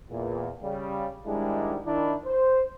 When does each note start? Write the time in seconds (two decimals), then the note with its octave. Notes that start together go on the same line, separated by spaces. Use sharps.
0.10 E2 A#2
0.63 C#3 G3
1.26 G#2 D#3 G3 G#3 D4 E4
1.85 D#3 D4 E4
2.25 C5